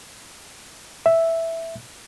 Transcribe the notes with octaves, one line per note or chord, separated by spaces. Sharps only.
E5